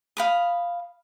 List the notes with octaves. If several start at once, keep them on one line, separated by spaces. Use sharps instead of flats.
F5 B5 D#6